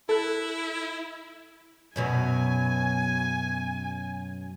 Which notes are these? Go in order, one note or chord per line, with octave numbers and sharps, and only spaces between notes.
E4 A4 F#6
F#2 B2 F#3 G#5